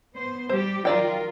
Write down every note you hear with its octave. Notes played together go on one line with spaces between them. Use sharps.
B3 C5
G3 G4 C5
D#3 F#3 F4 A#4 D5 G5